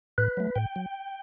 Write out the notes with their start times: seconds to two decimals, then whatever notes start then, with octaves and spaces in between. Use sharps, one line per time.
0.18 A2 B4
0.37 F#3 A3
0.56 A2 G5
0.76 F#3